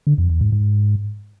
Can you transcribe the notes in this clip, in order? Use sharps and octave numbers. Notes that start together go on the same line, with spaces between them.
D3
F2
E2
G#2
G#2